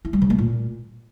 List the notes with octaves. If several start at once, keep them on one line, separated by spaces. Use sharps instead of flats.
E4
G3
C#3
A#3
A#2